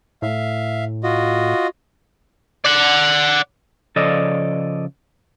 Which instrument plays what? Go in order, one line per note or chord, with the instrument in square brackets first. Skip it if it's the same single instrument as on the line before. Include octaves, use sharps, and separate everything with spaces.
[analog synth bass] A2 [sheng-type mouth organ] E5 F5
[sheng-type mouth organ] F4 F#4 D#5
[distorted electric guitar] D5 F#5
[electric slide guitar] C#3 F3 A4 D5 D#5